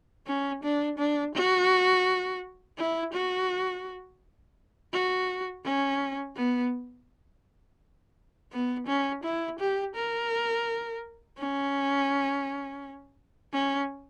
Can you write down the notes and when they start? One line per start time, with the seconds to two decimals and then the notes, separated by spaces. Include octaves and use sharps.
0.27 C#4
0.63 D4
0.98 D4
1.35 F#4
2.78 E4
3.13 F#4
4.93 F#4
5.65 C#4
6.36 B3
8.52 B3
8.87 C#4
9.24 E4
9.59 G4
9.95 A#4
11.38 C#4
13.53 C#4